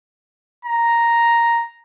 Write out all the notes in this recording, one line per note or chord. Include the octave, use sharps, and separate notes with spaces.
A#5